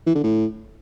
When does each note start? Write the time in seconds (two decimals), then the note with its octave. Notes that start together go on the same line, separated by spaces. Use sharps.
0.07 E3
0.15 D3
0.24 A2